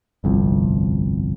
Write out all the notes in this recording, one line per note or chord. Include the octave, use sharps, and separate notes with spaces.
G1 C2 F2